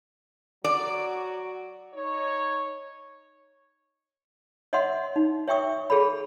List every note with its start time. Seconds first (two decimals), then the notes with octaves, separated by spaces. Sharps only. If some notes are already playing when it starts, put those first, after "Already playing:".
0.64 F#3 F#4 D5
1.94 D#4 C#5
4.73 C#5 D#5 E5 F#5 C6
5.16 D#4
5.48 C#5 E5 G5 C#6 D#6
5.90 G#4 A4 C#5 B5